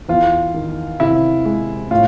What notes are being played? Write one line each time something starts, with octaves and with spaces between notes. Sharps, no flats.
E2 F4
D#3
C3 E4
G#3
A2 F4